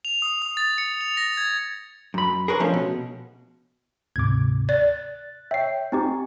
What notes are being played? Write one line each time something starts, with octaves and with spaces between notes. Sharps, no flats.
F7
D#6
D#6
A6
C#7
F7
A#6
G#6
F#2 B5
G#4 A#4 B4 C#5
F3 A3 C#4 D4
B2
D2 G#2 C3 D6 G#6
D5 F#6 A6
C#5 E5 G5 C7
C4 D#4 G4 G#5 C#6